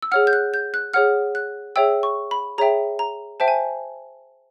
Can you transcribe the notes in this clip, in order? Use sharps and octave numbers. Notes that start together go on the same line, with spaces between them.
E6
G#4 C#5 F#5 F6
G6
F#6
G6
F#6
G#4 C#5 F#5 F6
F#6
G#4 C#5 E5 G5 E6
C#6
B5
G#4 C#5 E5 G5 A#5
A#5
C5 E5 G5 A5
G#5